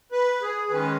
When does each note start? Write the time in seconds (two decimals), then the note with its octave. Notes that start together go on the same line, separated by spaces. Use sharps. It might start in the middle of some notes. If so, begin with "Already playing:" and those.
0.12 B4
0.41 G#4
0.70 D#3 G#3 C#4 B4